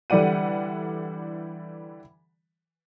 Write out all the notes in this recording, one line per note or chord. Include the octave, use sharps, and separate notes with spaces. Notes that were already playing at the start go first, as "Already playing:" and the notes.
D3 E3 G3 D5 F#5 D#7